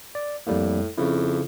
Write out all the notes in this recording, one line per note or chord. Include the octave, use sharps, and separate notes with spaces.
D5
F2 A2 G3 A#3
F2 C#3 E4